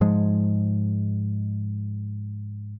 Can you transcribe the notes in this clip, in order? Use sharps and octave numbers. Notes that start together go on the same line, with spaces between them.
G#2 F3 G#3